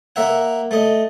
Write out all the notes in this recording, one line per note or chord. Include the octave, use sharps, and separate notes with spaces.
A#3 A#4 E5 F#5
A3 D#5